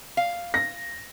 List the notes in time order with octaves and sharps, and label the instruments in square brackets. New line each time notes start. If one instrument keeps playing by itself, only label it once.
[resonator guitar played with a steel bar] F5
[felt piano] A#6